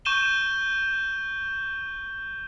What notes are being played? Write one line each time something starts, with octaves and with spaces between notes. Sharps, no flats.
C#6 G6 D#7 E7 G7